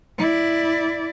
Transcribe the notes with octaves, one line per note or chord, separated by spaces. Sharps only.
E4 D5